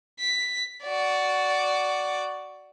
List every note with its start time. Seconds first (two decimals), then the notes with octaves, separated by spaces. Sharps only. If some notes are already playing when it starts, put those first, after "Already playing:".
0.20 B6
0.83 F#4 D5